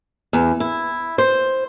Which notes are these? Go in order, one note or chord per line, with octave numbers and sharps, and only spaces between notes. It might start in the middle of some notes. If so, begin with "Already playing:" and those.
E2
E4
C5